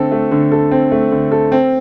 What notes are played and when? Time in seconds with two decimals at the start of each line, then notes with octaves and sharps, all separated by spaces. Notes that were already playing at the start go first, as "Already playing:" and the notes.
Already playing: D3 A3 C4 A4
0.12 A3
0.31 D3
0.52 A4
0.71 C4
0.92 A3
1.12 D3
1.32 A4
1.52 C4